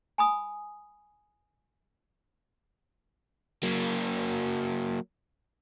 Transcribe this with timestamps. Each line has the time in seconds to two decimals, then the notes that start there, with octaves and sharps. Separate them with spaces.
0.18 G#5 B5 D#6
3.63 F#3 A#3